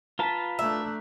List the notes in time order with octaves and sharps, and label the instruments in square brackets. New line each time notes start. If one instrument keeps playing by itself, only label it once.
[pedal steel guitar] F4 B4 A5 [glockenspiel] A#5 B6
[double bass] A3 D4 [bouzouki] E5